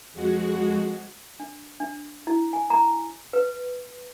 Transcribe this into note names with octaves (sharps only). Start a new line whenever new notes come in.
F2 G#3 F#4
D4
D4
E4
G#5
A#5
B4